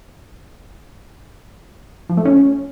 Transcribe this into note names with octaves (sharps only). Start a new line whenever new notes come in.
F3
A3
C#4